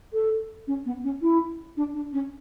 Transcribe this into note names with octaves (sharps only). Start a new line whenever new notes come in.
A4
C#4
B3
C#4
E4
D4
D4
C#4